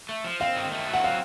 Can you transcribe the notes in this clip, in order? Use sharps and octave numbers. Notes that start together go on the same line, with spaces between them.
A3
F3
C4 F5
D#3
A3
F#3
F#5
C4 F5